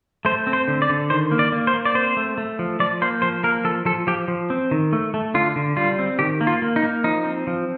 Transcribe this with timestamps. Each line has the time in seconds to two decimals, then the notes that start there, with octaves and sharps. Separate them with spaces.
0.25 A3 C5
0.47 C4
0.53 C5
0.68 D3
0.82 D5
0.89 D3
1.10 D#3 C5
1.31 A#3
1.39 D5
1.52 A#3
1.67 C5
1.74 A#3
1.85 D5
1.94 C4 C5
2.17 A3
2.38 A3
2.59 F3
2.80 F3 D5
3.02 A#3 C5
3.22 F3 C5
3.43 A#3 A#4
3.64 F3 A4
3.85 F3 A4
4.07 F3 G4
4.28 F3
4.50 C4
4.71 D#3
4.93 A3
5.14 A3
5.34 D3 F4
5.56 D3
5.76 G3 F4
5.99 C4
6.19 D#3 G4
6.41 A#3
6.47 F4
6.62 A#3
6.76 D#4
6.83 A#3
7.04 F3 D#4
7.25 C4
7.47 F3